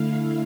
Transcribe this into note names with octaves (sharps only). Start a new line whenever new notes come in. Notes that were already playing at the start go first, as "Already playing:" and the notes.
Already playing: D3 A3 E4 F5